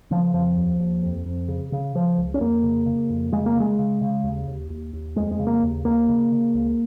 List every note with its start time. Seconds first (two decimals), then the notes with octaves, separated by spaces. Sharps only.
0.11 C#3 F3
0.33 F2 F3
0.57 D#2
0.80 D#2
1.02 F2
1.25 F2
1.48 C#3
1.72 C#3
1.95 C#3 F3
2.18 C#2
2.34 C#4
2.40 F2 A#3
2.64 C#3
2.86 C#3
3.10 F2
3.32 C#3 G#3
3.46 A#3
3.56 C#3 G#3
3.79 C#3
4.02 C#3
4.24 D#2
4.47 D#2
4.70 D#2
4.93 D#2
5.16 F2 G#3
5.31 G#3
5.39 C#3
5.47 A#3
5.63 D#2
5.85 D#2 A#3
6.08 C#3
6.32 C#3
6.54 C#2